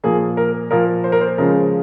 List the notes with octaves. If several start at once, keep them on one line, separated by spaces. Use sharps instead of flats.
A#2 F3 A#3 G#4
A#4
A#2 F3 A#3 A#4
C5
A#4
C5
C#3 F3 G#3 A#4